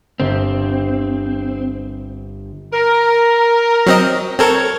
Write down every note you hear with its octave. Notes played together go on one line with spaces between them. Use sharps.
G1 C4 B6
A#4
F#3 C4 D#5
C4 A4 A#4 C#5